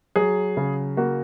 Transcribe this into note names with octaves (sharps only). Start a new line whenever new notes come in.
F#3 G#4
C#3
A#3 F#4